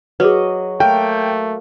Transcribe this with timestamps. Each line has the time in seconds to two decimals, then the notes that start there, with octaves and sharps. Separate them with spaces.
0.20 F#3 G#4 B4 D#5
0.80 A3 A#3 A#4 G5